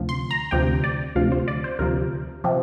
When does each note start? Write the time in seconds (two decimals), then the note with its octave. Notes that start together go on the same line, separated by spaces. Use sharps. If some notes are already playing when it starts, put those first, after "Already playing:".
Already playing: D2 C3 F3
0.09 C6
0.31 A#5
0.51 D2 C3 F3 G5
0.84 D5
1.15 D2 C3 F3 F5
1.32 C5
1.48 D5
1.64 C5
1.79 D2 C3 F3 A#4
2.44 C3 F3